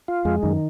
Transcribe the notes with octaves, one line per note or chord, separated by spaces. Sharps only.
F4
F2 G#3
F#2 D#3